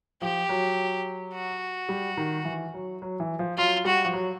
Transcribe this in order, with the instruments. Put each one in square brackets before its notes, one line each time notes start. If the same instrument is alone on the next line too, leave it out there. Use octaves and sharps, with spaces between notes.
[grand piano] F3 [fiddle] G4
[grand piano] F#3
[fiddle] F#4
[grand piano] G3
D#3
E3
F#3
F#3
E3
F3
[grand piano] F#3 [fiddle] F4
[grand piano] G3 [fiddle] F#4
[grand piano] F3
F#3